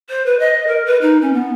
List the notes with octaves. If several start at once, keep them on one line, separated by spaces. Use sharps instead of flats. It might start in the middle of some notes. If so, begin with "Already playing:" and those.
C5
B4
D#5
A#4
B4
D#4
C#4
B3